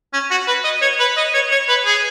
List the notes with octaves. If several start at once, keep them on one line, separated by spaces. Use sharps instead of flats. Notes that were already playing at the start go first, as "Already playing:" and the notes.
C#4
F#4
B4
D#5
C#5
B4
D#5
C#5
C#5
B4
G#4